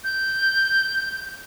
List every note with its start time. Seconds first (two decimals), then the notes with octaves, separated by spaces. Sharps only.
0.04 G6